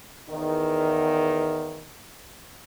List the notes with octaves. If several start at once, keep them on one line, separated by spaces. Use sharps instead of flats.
E2 D#3